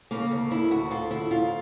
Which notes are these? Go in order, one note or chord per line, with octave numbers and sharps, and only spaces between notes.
C#3 A#3
D2
D2 E4
D2 F#4
D2 F4
D2 E4
D2 F4